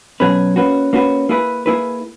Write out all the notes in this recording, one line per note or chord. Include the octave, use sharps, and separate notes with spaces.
B2 F#3 C#4 G#4 B4
A#3 C#4 F#4 B4
A#3 C#4 F#4 B4
A#3 E4 G#4 B4
A#3 E4 G#4 B4